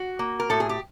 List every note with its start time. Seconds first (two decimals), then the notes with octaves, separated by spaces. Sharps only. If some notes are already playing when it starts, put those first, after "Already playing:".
Already playing: F#4
0.19 A#3
0.40 A#4
0.50 A2 A4
0.60 G#4
0.69 G4